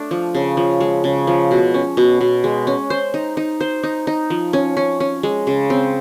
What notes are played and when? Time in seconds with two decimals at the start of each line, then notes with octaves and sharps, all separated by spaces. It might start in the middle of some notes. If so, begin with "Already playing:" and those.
Already playing: A3 D4
0.11 F3
0.35 C#3
0.57 F3
0.80 G#3
1.04 C#3
1.27 F3
1.51 B2
1.74 C#4
1.97 B2
2.21 B2
2.44 G#3
2.67 C#4
2.90 C5
3.14 D#4
3.37 D#4
3.61 C5
3.83 D#4
4.07 D#4
4.30 F3
4.53 C#4
4.77 C#4
5.00 C#4
5.23 G#3
5.47 C#3
5.70 C4